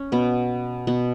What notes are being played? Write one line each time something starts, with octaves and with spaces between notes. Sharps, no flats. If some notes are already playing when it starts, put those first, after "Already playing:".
Already playing: C#4
B2 B3
B2 B3